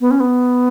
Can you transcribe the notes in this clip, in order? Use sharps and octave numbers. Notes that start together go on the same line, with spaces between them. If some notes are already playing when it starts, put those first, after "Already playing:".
B3
C#4
B3